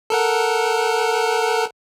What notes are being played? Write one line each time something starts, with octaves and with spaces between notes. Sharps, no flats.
A4 A#4 F#5